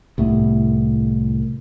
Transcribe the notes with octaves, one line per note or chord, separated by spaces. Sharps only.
C2 A2 A3 B3